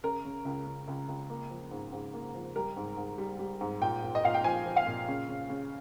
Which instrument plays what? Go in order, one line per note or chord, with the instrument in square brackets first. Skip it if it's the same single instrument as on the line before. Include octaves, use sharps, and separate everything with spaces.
[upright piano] C#3 A#4
C#3
C#2
C#2
C#2
C#2
A#3
F3
G#2
G#2
A#3
F3
G3 A#4
G#2
G#2
G3
G3
G#2
A#2 G5
A#2
D#5
A#2 F5
G5
F3 G#5
F3
F5
A#2
C#3
C#3
C#3